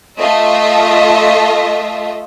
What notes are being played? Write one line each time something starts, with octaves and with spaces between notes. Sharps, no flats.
A3 F4 D#5 E5